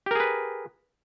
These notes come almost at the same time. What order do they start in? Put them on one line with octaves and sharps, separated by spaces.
G4 A#4 G#4 B4